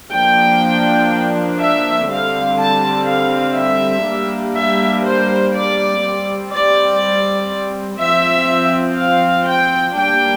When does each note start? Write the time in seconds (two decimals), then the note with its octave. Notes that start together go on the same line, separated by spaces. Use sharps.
0.12 F3 A#3 D4 G5
1.60 E5
2.09 D3 G3 C4 F5
2.58 A5
3.07 F5
3.56 E5
4.06 G3 A#3 D4
4.55 E5
5.04 C5
5.54 D5
6.03 G3 C4
6.52 D5
7.99 F3 C4 E5
8.97 F5
9.46 G5
9.96 G3 A#3 D4 G5